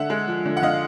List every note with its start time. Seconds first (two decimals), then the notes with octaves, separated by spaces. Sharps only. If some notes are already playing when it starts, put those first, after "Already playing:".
Already playing: D3 E5 F#5
0.10 G#3
0.27 F3
0.45 D3
0.57 F#5
0.62 D3 D#5 F5